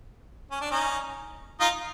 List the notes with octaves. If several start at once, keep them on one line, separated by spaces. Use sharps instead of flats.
C#4
D4
C#4 D#4
D#4 F4